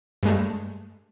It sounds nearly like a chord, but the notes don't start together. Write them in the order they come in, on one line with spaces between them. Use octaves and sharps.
G2 G#3 A3